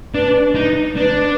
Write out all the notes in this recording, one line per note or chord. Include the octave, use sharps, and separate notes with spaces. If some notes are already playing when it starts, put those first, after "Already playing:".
D4 B4
D#4
D4 B4